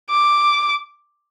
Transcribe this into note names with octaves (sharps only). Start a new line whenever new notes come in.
D6